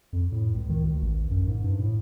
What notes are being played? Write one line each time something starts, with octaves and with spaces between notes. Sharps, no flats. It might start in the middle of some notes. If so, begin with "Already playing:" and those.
F2
A2
C#2
D#3
D2
A1
F#2
G#2
G2
A2